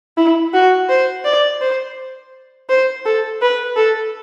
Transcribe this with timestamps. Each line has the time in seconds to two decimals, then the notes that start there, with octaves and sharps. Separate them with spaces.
0.17 E4
0.54 F#4
0.89 C5
1.25 D5
1.61 C5
2.69 C5
3.05 A4
3.42 B4
3.76 A4